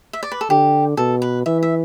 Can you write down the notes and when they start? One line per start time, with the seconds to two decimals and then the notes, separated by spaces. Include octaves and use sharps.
0.13 E5
0.23 D5
0.32 B4
0.41 A4
0.50 D3 G4
0.97 B2 A4
1.22 B4
1.46 E3 E5
1.63 E5